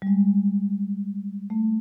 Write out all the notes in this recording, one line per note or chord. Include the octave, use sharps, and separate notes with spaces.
G3
G#3
A3